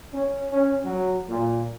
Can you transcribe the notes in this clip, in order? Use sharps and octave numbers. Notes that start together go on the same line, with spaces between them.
C#4
C#4
F#3
A#2